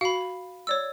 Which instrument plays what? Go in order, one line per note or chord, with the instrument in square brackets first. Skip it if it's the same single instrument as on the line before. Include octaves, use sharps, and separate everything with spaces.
[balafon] F#4 [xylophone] F5 B5
[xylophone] C#5 D5 E6